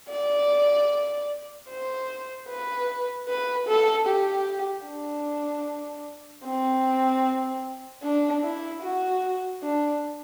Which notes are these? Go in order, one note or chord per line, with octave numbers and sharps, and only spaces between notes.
D5
C5
B4
B4
A4
G4
D4
C4
D4
E4
F#4
D4